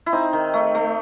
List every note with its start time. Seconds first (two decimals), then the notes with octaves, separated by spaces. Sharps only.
0.06 E4
0.12 C4 D#4
0.33 D#3
0.54 A3
0.75 A3